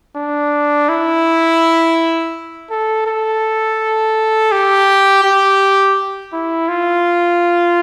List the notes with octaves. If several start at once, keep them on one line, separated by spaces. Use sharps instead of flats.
D4
E4
A4
A4
G4
G4
E4
F4